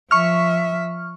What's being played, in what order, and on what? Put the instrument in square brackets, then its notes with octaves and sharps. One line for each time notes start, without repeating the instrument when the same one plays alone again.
[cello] F3 E5 [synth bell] C#6 F6